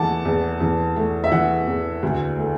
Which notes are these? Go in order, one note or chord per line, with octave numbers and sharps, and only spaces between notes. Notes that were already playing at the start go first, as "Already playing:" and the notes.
Already playing: E2 E3 A3 F#5 A5 D6
E2
E2
A3
E5
E3 F#5
E2
D2
A3